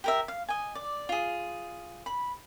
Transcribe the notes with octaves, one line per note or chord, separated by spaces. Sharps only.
G4 A#4 E5
F5
D#5 G#5
D5
F4 G#4
B5